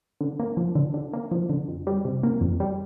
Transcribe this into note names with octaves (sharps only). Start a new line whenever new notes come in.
D3
A#3
F3
D3
D3
A#3
F3
D3
F2
G3
C3
A#3
F2
G3